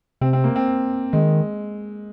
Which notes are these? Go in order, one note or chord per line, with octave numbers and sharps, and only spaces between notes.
C3 C4
C4
A#3
C4
D#3 G#3